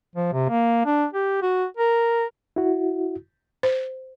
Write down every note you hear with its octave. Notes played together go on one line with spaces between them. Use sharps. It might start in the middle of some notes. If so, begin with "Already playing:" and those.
F3
C3
A#3
D4
G4
F#4
A#4
E4 F#4
C5